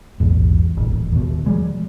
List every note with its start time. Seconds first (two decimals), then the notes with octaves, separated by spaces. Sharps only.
0.20 A#1 E2 G#2
0.77 D#1 A1
1.12 D#2 B2
1.46 F3 G3 G#3